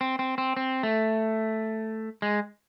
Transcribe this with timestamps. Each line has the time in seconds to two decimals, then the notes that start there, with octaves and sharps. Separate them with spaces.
0.01 C4
0.19 C4
0.38 C4
0.57 C4
0.83 A3
2.22 G#3